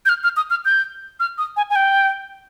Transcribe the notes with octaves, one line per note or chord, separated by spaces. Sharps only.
G6
F6
F6
D#6
F6
G6
F6
D#6
G#5
G#5
G5